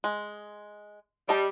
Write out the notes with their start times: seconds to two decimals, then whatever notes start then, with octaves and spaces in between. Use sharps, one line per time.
0.04 G#3
1.29 G3 D#5 A5